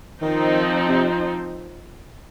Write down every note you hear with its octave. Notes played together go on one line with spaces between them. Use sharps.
D#3 F3 C4 D#4 C5
C3